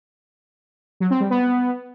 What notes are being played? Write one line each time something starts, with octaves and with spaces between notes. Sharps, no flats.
F#3
C4
G3
B3